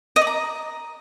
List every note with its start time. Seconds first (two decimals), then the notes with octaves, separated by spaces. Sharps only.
0.16 D#5
0.21 D5
0.27 A#5